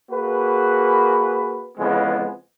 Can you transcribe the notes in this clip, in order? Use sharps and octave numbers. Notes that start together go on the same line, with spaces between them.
A#3 F#4 G#4 B4
F2 C#3 E3 G#3 B3